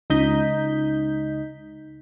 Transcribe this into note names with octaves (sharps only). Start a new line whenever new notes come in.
C#2 D#4 D#5 G6 B6